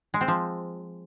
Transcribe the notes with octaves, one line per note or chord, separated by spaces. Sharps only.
G#3
C4
F3